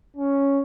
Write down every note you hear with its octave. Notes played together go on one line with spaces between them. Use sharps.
C#4